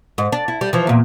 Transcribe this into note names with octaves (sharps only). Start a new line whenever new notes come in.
G#2
D4
E4
G3
E3 F3
E2 A#2